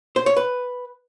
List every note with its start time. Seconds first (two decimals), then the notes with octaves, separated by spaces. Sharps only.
0.16 C5
0.26 C#5
0.37 B4